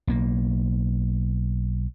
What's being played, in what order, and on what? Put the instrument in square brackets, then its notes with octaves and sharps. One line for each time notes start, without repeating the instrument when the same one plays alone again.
[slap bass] B1 A#3